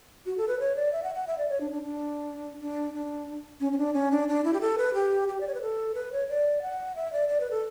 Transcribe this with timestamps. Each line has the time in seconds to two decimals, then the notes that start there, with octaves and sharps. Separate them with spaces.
0.26 F#4
0.38 A4
0.48 B4
0.60 C#5
0.76 D5
0.93 E5
1.04 F#5
1.15 F#5
1.27 E5
1.38 D5
1.49 C#5
1.61 D4
1.71 D4
1.83 D4
2.60 D4
2.94 D4
3.60 C#4
3.72 C#4
3.78 D4
3.94 C#4
4.11 D4
4.28 D4
4.44 E4
4.53 G4
4.61 A4
4.78 B4
4.94 G4
5.28 G4
5.40 D5
5.48 C#5
5.54 B4
5.62 A4
5.95 B4
6.12 C#5
6.29 D5
6.62 F#5
6.96 E5
7.13 D5
7.28 D5
7.41 B4
7.51 A4